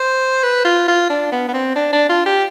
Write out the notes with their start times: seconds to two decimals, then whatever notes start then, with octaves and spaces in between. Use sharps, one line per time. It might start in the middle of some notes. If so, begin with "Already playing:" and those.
Already playing: C5
0.43 B4
0.65 F4
0.88 F4
1.10 D4
1.32 B3
1.48 B3
1.54 C4
1.76 D4
1.93 D4
2.09 F4
2.26 G4